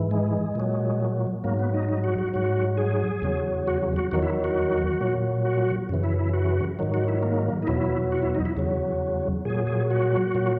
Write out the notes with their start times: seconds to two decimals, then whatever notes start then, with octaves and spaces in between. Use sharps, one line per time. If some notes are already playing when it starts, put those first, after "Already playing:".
Already playing: G#2 E3
0.11 G#3
0.55 A#2 F#3
1.44 G#2 F#3 A#3
1.59 B3
1.74 D#4
1.89 D#4
2.04 F#4
2.18 F#4
2.34 G#2 F#3 F#4
2.77 G#4
3.22 E2 C#3 F#3
3.68 F#4
3.96 F#4
4.11 E2 D#3 F#3 F#4
4.22 E4
4.44 F#4
5.01 A#2 F#3
5.45 F#4
5.89 F#2 C#3 E3
6.04 E4
6.19 E4
6.34 F#4
6.79 G#2 D#3 F#3
6.94 F#4
7.08 E4
7.23 A#3
7.62 D#4
7.67 E2 B2 F#3 E4
8.12 F#4
8.22 E4
8.35 D#4
8.45 E4
8.57 E2 C#3 F#3
9.45 A#2 F#3 G#4
9.67 G#4
9.91 F#4
10.35 A#2 F#3